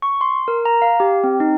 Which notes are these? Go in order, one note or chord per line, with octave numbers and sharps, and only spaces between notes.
C#6
C6
A#4
A#5
F5
G4
C4
D#4